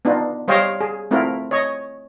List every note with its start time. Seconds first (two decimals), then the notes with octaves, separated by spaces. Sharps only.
0.05 B3 D4 D#4 F4
0.48 G3 C5 C#5 D#5 F5 G5
0.81 G#4
1.11 A3 C4 E4 F4 A#4
1.51 C#5 D#5